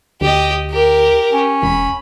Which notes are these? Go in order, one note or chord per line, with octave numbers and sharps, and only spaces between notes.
D2 G4 D#5
G4 A#4
C#4
E1 B5